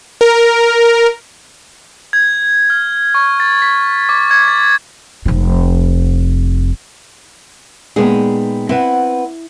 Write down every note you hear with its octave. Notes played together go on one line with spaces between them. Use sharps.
A#4
G#6
F6
C#6
A6
B6
D6
G#6
A6
F1 C3
A#2 G#3 B3 D#4 G#4 G5
C4 E4 B4 F#5